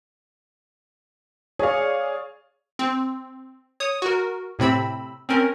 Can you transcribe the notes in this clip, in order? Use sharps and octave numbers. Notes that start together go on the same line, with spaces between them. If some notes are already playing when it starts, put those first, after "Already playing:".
G#4 C#5 D5 F5
C4
C#5 D#6
F#4 A#4
A2 C3 C4 B5 E6
C4 C#4 A#4